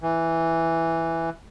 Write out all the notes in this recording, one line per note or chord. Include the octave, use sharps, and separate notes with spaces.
E3